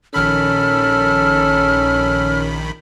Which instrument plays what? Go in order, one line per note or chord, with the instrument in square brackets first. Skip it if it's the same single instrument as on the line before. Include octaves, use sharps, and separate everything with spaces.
[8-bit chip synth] A#1 D#3 B5 [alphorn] C#4 [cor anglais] A4 [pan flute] F6